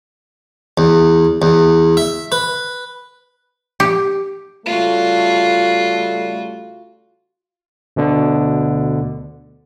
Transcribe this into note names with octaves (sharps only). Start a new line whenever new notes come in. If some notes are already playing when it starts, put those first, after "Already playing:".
E2
E2
E5
B4
G4
C#3 G3 A3 F4 F#4
D2 B2 D3